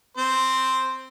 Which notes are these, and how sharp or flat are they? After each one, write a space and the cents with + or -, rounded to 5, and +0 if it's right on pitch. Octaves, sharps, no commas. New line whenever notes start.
C4 +0 C5 +0